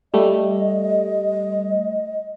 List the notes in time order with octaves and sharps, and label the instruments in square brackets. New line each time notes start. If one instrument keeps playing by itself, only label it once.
[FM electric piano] G3 A3 [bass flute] D#5